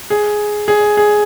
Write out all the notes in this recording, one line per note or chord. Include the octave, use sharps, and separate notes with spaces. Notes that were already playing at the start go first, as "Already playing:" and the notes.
G#4
G#4
G#4